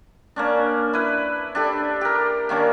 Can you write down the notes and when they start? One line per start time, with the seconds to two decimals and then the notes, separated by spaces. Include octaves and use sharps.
0.36 A#3 C#4 D4
0.93 E4 B4
1.55 D4 G4 A4
2.01 G4 A#4
2.49 D#3 A#3 C#4 D4